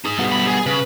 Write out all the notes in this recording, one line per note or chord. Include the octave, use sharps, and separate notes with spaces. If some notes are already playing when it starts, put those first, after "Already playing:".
D#4 G#4
G3 B3 F#4
F#2 B5
G#4
C#3 B4